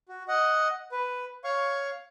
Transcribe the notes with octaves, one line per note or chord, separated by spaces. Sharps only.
F#4
D#5 F#5
B4
C#5 F5 C#6